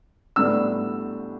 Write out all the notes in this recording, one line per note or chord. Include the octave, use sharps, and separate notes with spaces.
A2 G3 B3 D4 E6